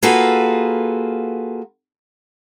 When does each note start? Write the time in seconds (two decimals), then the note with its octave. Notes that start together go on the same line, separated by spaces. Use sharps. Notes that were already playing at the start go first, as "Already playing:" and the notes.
0.03 A#3 F4 F#4 G#4 A4 B4